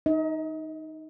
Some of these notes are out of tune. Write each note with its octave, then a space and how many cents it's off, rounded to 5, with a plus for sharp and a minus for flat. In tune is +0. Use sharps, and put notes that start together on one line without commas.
D#4 +0 D#5 +40